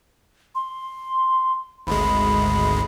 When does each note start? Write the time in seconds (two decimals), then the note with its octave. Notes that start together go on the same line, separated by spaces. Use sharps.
0.55 C6
1.87 G#1 D2 G#3 B5